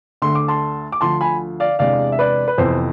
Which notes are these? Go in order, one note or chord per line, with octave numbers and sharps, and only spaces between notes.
D2 D3 A3 C6
D6
A5 C6
D6
D2 D3 F3 A5 C6
G#5 B5
D5 F5
E2 C3 G#3 D4 D5 F5
E5
B4 D5
B4
F2 C3 E3 B3 C5